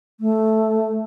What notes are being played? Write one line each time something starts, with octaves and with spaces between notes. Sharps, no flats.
A3